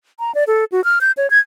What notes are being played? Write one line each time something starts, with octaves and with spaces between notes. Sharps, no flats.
A#5
D5
A4
F#4
F6
G6
C#5
G#6